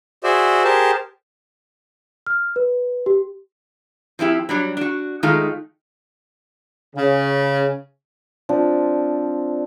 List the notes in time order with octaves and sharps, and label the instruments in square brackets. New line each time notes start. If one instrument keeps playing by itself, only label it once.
[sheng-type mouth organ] F#4 G#4 C5 D5 E5
G4 G#4 A#4 C5 A5
[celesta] F6
B4
G4
[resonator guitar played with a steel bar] F3 C4 E4 G4
F#3 G3 D4
D4 F#4
D#3 G#3 A3 D#4 F4
[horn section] C#3
[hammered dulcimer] F3 C4 D4